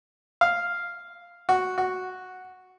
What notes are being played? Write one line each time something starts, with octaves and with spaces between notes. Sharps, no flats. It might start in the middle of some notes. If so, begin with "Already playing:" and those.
F5
F#4
F#4